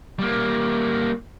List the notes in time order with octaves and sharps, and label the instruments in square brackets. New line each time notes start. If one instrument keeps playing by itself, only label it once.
[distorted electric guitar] G3 A#3